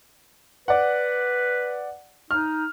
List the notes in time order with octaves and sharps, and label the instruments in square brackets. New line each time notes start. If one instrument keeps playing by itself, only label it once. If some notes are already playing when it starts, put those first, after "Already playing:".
[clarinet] B4 [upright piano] D5 F#5
[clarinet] D#4 [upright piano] F6